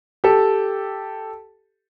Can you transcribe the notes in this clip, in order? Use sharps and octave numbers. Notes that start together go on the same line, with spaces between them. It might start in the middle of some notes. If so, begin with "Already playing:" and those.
G4 A4